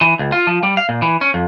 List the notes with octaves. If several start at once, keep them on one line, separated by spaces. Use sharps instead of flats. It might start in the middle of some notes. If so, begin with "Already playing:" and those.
E3
C#2
F4
F3
G3
F5
A#2
E3
C#4
F2